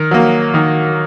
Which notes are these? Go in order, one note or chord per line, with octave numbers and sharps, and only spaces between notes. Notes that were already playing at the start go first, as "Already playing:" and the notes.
Already playing: D#3 A#4
F#3 A#3
D#3